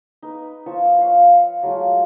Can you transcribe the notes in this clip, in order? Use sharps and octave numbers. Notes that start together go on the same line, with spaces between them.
D#4 B4
F3 C#6 E6
C#5 F5
F#3 G#3 A3 F4